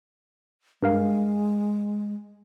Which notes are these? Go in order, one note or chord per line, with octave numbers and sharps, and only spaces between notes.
G2 G#3 A#4 F5